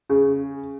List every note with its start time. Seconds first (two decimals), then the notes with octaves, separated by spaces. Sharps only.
0.10 C#3